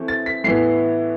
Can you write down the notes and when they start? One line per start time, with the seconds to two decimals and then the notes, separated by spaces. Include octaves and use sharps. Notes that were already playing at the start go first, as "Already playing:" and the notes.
Already playing: E3 A3 C4
0.08 A6
0.26 B6
0.44 A2 E3 B3 C7